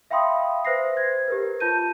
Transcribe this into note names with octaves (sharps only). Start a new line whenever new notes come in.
E5 F5 G5 B5 C6 D#6
B4 C5 E5 A#6 C7
C5 G#6
G4 A#4 B4
F4 A5 G6 D#7